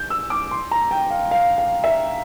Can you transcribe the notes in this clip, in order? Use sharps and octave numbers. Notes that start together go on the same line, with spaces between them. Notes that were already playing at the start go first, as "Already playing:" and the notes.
Already playing: G6
E6
D6
C6
A#5
G5
F5
F5
F5
E5